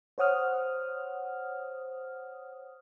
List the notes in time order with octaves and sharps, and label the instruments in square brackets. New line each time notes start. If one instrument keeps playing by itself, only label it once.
[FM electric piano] C5 C#5 F#5 D#6 F6